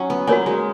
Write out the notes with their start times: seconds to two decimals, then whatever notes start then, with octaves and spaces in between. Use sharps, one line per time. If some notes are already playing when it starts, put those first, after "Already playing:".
Already playing: F#3 C#4 D#4
0.10 B3
0.27 A#3 F#4 A#4 C#5 G#5
0.46 G#3